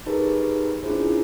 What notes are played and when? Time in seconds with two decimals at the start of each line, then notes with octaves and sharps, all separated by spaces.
0.06 D#4 G4 G#4 A#4 B4
0.83 C#4 D4 E4 F4 G#4 C5